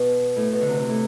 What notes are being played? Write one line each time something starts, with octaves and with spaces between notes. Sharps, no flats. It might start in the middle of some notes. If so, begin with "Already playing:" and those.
Already playing: B2
A2
B2
D3
C3
C3
A2